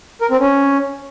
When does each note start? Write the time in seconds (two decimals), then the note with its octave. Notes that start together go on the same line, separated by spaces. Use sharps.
0.21 A#4
0.31 C4
0.40 C#4